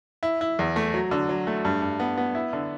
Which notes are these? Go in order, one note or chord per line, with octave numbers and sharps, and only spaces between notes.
E4
E4
E2
A3
F#3
D3
F#3
A3
G2
G2
B3
B3
E4
D3